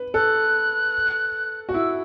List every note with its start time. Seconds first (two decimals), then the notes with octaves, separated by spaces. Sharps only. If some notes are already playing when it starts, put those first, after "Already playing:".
Already playing: B4
0.14 A4 F#6
1.69 F#4
1.74 E4 E6